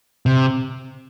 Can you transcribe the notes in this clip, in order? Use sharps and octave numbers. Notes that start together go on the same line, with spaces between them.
C3